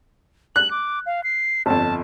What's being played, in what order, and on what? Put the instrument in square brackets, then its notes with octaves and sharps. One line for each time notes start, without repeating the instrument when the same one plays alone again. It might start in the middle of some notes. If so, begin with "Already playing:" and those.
[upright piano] F#6 [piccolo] F#7
[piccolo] D6
F5
C7
[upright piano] G1 F2 [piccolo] A5